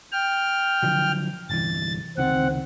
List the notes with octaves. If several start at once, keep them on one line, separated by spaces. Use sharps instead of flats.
G5 F6
D3 F3 F#3
G1 C2 E3 A6
C#2 C3 D#3 C4 F#5